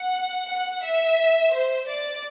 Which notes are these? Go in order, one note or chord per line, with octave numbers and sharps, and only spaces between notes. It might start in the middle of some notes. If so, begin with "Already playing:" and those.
Already playing: F#5
F#5
E5
C5
D5